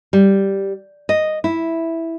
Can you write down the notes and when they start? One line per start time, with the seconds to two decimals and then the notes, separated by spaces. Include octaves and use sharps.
0.13 G3
1.09 D#5
1.44 E4